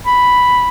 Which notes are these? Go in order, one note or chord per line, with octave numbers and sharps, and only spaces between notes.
B5